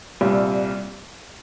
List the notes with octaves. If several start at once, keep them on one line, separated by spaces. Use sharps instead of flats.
C2 A#2 G3